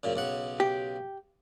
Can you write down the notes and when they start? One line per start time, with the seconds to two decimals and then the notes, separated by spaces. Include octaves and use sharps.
0.03 F#2 A#2 C#3
0.16 B1 C#3 F#5
0.60 G4